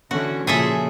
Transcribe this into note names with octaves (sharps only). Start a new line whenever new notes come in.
D3 E3 C#4 F#4
A#2 C#3 F3 G#4 A4 E5